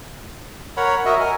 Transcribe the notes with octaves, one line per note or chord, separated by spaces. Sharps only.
A#4 C#5 F#5 B5
F#4 A#4 D#5 E5
A#4 G#5